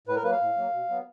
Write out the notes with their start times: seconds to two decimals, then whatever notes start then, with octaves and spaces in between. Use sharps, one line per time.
0.08 A2 B4
0.16 A#4
0.23 F#3 A#3 B4
0.32 F5
0.41 A2
0.57 F#3 A#3
0.72 B2
0.89 F#3 B3